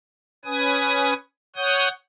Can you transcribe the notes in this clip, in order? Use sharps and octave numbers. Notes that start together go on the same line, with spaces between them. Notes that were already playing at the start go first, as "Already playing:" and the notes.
C#4 B4 G#5 D#6
C#5 F#5 D#6 G6